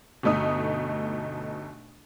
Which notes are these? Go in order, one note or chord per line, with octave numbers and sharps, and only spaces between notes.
G1 B2 A3 D#4 D#6